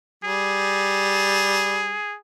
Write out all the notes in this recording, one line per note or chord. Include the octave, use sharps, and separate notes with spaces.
G3 G#4